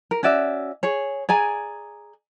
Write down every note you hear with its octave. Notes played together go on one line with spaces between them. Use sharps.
A#4
C#4 F#4 D5 E5
G#4 C#5
G#4 D5 G#5 A#5